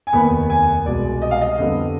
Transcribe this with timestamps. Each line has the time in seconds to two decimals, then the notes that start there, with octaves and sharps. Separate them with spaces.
0.07 G#5
0.13 F1 D#2 D#3 B3 B5
0.50 G#5
0.85 C2 B2 G#3 D5
1.22 D#5
1.31 F5
1.41 D#5
1.57 F2 D3 G3 B3